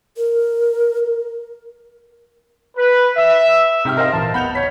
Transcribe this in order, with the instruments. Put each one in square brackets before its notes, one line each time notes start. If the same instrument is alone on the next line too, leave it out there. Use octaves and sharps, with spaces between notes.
[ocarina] A#4
[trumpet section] B4
E5
[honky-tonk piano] G#2 G4 F6 [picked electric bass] C3 [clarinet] D#4
[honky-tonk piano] A#4 C5 F5 [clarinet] D#5
[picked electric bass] G#1 A#2 E3 [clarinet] A5
[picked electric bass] D1 B3 [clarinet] F#5 [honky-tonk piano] B5 G6 F7
[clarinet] C#5 [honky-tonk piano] B6